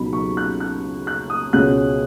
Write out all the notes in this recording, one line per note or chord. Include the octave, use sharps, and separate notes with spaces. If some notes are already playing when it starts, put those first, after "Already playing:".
Already playing: C#2 B2 F#3 D#4 B5
C#6
F#6
F#6
F#6
D#6
C#2 B2 G#3 C#4 F#6